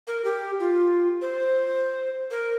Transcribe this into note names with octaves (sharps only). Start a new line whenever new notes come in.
A#4
G4
F4
C5
A#4